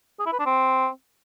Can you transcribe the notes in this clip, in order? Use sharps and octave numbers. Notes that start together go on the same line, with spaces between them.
G#4
E4
B4
D4
C4